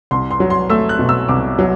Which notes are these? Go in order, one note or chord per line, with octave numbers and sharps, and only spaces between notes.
C2 C6
C6
F#3
C6
A3 E6
F#6
B2
E6
C2 D6
F#3